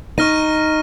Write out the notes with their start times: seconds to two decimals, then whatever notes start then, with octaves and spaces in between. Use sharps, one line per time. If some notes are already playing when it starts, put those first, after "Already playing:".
0.18 D#4 C#6 F6 A#6 D#7